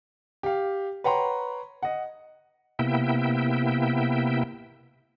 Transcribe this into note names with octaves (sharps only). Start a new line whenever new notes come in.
G4 F5
B4 C#5 F#5 G5 A#5 C6
D#5 F#5
C3 A#3 B3 E4 E5 G5